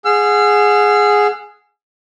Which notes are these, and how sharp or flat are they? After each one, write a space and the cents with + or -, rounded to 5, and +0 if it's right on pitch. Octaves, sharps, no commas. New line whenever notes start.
G#4 +0 F#5 -25 E6 +45